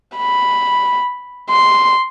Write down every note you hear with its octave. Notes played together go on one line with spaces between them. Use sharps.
B5
C6